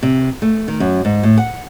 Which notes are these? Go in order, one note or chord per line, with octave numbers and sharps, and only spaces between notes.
C3
A3
D#3
F#2
G#2
A2
F#5